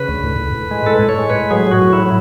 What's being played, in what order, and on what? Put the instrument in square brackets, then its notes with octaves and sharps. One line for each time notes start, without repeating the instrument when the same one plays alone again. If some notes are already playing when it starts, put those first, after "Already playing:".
Already playing: [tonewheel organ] C#3 B4
D2
A2
A2
A2
G#3
A2 A4
A2
C#5
G#3
B4
A2
F#3 G#4
F#3 F#4
A2
F#3 E4